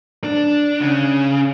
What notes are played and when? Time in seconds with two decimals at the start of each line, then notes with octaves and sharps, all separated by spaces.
0.24 D4
0.81 C#3